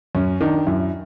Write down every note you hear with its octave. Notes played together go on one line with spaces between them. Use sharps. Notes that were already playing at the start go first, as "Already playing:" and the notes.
F#2 C#4
D#3 D4
F#2 E4